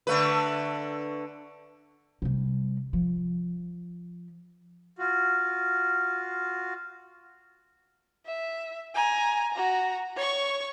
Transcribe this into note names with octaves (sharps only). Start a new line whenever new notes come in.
D3 A3 B4
C3 G3
F3
F4 F#4
E5
G#5 A#5
F#4 A#5
C#5 C#6